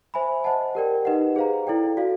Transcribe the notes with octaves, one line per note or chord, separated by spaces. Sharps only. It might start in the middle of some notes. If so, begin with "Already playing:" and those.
C5 E5 G#5 B5
C5 D#5 F#5 A5
G4 A#4 D5 G5
D#4 G4 B4 D#5 F#5
G#4 C5 F5 A#5
E4 A4 D5 G5
F#4 A4 D5 F5